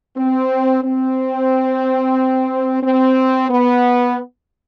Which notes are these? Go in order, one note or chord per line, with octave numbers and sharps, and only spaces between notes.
C4
C4
C4
B3